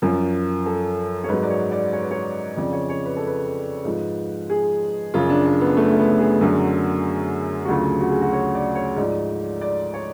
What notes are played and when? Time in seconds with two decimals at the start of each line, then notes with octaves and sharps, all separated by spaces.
0.02 F#2 F3
0.66 A4
1.24 C#5
1.29 G#2 F#3 B4
1.43 D5
1.50 C#5
1.72 D5
1.93 C#5
2.03 B4
2.11 C#5
2.57 F2 C#3 F3 D5
2.73 C#5
2.89 C#5
3.06 B4
3.17 A4
3.27 B4
3.85 G#2 F3
4.50 G#4
5.14 F#2 C#3 F3 F4
5.30 D4
5.46 D4
5.61 B3
5.77 A3
5.92 A3
5.99 B3
6.19 G#4
6.41 F#2 D3 F#3
7.65 F#4
7.69 D2 C#3 F#3 F4
8.01 F#4
8.11 G#4
8.21 F#4
8.33 C#5
8.55 D5
8.75 C#5
8.96 G#2 F3 D5
9.61 D5
9.94 C#5